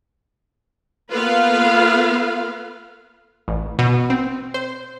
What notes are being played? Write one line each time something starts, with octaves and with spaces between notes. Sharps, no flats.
A#3 B3 F4 A4 B4 F5
A1
B2
C4
C5